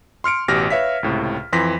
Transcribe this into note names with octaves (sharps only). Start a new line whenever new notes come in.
C6 F6 C#7 D7
A1 B2 G4 F6 A#6
B4 C#5 E5 F5 B6
C#2 A2 C3
F2 E3 C6 A#6 B6